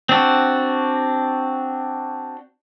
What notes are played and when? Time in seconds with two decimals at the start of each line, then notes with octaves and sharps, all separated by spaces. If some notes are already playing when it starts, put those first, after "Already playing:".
0.09 C4 D4 F#4